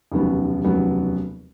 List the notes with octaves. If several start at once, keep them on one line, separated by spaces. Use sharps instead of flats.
F1 D#2 C#3 F#3 B3
F1 D#2 C#3 F#3 B3